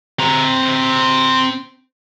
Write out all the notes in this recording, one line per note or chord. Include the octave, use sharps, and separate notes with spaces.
C4 A#5